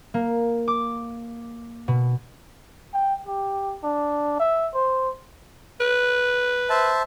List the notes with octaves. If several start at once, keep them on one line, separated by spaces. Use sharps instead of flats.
A#3
D6
B2
G5
G4
D4
E5
C5
B4
C5 E5 A5